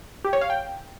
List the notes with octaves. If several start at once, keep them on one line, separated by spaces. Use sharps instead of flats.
G4
C#5
F5
G5